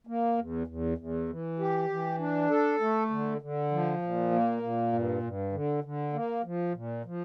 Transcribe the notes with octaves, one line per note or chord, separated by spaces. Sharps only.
A#3
E2
E2
E2
E3
G4
E3
D4
A4
A3
D3
D3
F3
A#2
A#3
A#2
G2
G2
D3
D3
A#3
F3
A#2
F3